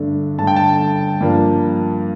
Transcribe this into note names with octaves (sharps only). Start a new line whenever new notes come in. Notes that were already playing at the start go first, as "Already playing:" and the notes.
Already playing: G2 D3 A3 D4
G2 D3 A3 D4 A5
G5
A5
G2 F3 A#3 D4